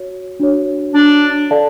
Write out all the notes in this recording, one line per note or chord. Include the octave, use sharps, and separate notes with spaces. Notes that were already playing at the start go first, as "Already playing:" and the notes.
Already playing: F#4 C#5
D4 F#4 C#5
D4
A4 D5 F5 A5